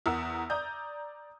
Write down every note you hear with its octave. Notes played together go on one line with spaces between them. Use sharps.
E2 A#4 F#5 E6
D5 A#5 D#6 G6